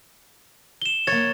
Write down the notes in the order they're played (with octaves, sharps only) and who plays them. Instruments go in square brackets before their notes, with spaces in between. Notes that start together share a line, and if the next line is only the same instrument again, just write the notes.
[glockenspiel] E7 G7
[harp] A#3 C#5 [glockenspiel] A6